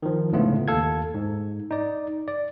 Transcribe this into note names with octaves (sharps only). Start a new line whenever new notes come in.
D#3 F3
C#2 A2 D3 A3 B3 F4
D#2 A4 F5 G#6
G#2
D#4 D5
D5